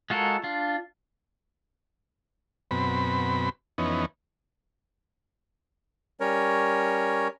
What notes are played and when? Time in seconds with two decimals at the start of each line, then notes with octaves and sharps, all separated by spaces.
0.10 G#3 F4 F#4 A4 A#4
0.44 D4 F4
2.71 F#2 B2 C4 B5
3.78 F2 E3 B3 C#4 D#4
6.20 G3 C#4 A#4 C#5